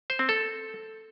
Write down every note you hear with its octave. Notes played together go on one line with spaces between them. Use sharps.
C5
C4
A4